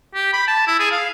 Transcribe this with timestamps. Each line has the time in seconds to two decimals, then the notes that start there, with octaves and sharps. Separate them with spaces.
0.15 G4
0.33 B5
0.48 A5
0.67 E4
0.79 G#4
0.92 F5